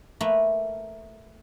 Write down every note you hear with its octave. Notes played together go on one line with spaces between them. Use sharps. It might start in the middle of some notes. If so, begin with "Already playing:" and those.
A3 A#3 A#4 B4 E5